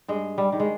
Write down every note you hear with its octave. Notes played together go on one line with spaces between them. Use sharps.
G2 G#3
G3
D#3 G3
G#3